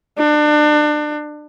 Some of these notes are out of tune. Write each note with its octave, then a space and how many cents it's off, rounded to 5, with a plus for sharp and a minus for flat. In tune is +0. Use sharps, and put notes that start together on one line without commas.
D4 +30